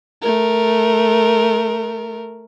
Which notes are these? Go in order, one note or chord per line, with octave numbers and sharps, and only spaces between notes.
A3 A#4